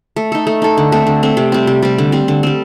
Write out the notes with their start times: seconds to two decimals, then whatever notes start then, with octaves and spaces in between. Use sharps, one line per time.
0.16 A3
0.32 D#4 A4
0.47 A3
0.62 D#4 A4
0.77 D3
0.92 A3 C4
1.07 D3
1.23 A3 C4
1.37 C3
1.52 G3 C4
1.67 C3
1.82 G3 C4
1.98 D3
2.12 G3 C4
2.28 D3
2.43 G3 C4